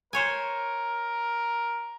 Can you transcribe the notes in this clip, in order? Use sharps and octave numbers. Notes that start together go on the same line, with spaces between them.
A#4 C5 C#5 G#5